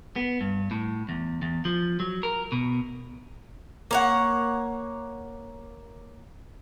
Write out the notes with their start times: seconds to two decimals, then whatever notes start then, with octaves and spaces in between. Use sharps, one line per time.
0.16 B3
0.41 G2
0.71 A2
1.09 E2
1.42 E2
1.65 F3
2.00 F#3
2.23 A#4
2.52 B2
3.91 A#3 C#5 F#5